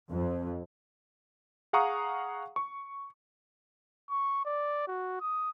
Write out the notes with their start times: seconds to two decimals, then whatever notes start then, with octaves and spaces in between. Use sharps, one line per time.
0.11 F2
1.73 G#4 F5 F#5 A#5 C#6 D#6
2.56 C#6
4.10 C#6
4.45 D5
4.88 F#4
5.21 D#6